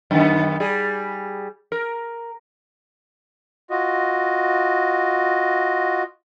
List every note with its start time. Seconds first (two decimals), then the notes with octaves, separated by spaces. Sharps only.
0.11 F#2 D#3 B3
0.60 G3 G#4
1.72 A#4
3.70 F4 F#4 D#5